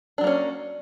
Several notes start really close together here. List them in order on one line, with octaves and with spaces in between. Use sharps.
D4 F#3 A#3 C#4